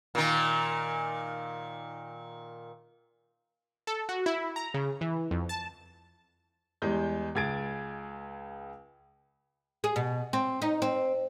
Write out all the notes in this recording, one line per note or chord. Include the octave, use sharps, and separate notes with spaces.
A#2 D#3
A4
F#4
E4
A#5
C#3
E3
F2
A5
E2 G3 G#3 G6
C#2 G#4 G#6 A6 D7
G#4
B2
C4
D#4
C4